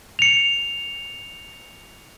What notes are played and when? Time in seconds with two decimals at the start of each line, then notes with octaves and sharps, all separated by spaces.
0.19 C#7 F7